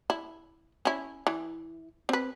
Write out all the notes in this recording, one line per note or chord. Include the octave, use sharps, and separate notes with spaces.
E4
C#4 E4
E3
C4 B4